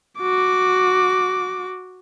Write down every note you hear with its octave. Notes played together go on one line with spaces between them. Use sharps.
F#4 D6